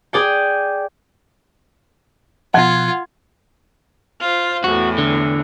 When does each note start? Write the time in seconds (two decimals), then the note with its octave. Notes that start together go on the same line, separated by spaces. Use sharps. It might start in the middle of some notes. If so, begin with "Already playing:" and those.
0.13 G#4 D5 G5
2.54 B2 F3 F4 F#5 G#6
4.20 F4 C5
4.64 E2 A2 E3 F#4
4.98 D3